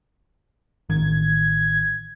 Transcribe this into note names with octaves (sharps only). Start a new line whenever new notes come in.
A1 D#3 G#6